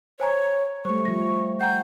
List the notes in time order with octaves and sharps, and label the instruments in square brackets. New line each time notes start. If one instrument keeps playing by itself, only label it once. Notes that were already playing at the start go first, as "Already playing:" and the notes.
[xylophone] C5 G#5 A#5 [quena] C#5
[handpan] G3 A3 [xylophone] C5 [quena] C#6
[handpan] F3 G3 [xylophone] A#6
[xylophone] F#5 G5 A#5 [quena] G6